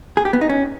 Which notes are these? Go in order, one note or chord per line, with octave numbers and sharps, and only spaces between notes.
G#4
G4
B3
D#4
C#4